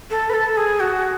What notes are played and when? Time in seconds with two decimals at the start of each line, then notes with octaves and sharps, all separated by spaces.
0.10 A4
0.30 B4
0.34 A4
0.57 G#4
0.80 F#4